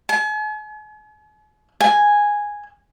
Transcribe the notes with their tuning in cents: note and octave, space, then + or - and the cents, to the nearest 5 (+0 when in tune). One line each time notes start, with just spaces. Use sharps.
G#5 +45
G#5 -5